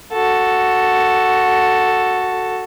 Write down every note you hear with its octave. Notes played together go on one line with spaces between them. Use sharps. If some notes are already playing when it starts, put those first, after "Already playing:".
F#4 A4